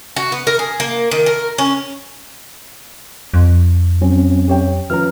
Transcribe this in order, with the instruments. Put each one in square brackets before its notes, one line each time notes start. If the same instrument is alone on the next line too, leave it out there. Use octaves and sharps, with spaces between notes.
[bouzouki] F#4
B3
A#4
G#4
A#3
D#3
A#4
C#4
[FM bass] F2
[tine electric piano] F#3 C4 C#4
[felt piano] G4 C#5 G5
[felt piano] F3 C#4 B4 [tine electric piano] A#5 F6